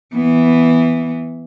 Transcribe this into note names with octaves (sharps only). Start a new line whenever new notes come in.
E3 B3